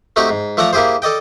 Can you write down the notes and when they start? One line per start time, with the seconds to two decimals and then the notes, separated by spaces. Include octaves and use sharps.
0.16 A3 C4 D#4 F#4 G4
0.29 G#2
0.57 F3 A3 A4 D5 F#5 A#5
0.73 A#3 E4 G4 G#4 C5
1.02 A4 D5 D#5 G5